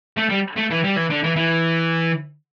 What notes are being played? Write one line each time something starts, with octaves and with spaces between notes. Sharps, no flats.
A3
G3
A3
E3
G3
E3
D3
E3
E3